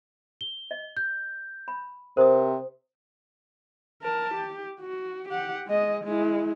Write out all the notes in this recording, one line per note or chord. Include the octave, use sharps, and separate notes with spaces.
G7
D#5
G6
B5
C3 A#4 C5 D#6
A#4 A5
G4
F#4
G4 F#5
G#3 D#5
G#3 E4